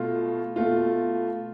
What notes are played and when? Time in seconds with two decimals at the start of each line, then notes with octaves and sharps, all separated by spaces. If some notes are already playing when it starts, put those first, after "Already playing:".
Already playing: B2 A3 F4
0.56 B2 A3 F4